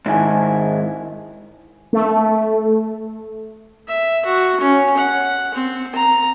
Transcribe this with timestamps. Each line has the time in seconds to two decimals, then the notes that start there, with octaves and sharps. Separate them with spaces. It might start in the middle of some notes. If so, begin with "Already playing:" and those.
0.06 G#2 D#3 E4 G#5
1.93 A3
3.88 E5
4.26 F#4
4.61 C#4
4.97 F#5
5.54 C4
5.95 A#5